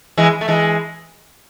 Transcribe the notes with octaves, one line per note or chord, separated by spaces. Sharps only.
E3 G#3
A3
E3 G#3